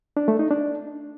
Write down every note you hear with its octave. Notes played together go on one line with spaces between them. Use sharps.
D4
A3
D#4
D4